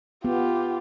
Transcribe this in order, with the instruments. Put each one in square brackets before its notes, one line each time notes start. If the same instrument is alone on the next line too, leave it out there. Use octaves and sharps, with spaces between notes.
[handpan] B3 [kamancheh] F4 G4